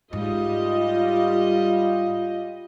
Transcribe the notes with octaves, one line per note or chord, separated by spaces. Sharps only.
G#2 G3 F4 D#5